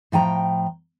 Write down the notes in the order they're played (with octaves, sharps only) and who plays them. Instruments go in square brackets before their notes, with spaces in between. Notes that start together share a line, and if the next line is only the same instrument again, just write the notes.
[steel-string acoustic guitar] A2 F3 G5 A#5